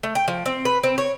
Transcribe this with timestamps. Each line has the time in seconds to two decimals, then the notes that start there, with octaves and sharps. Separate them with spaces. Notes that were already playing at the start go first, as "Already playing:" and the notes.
0.03 A3
0.15 G5
0.28 F3
0.46 C4
0.65 B4
0.83 C4
0.98 C#5